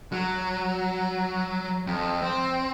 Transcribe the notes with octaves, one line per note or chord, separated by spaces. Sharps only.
F#3
F2
C4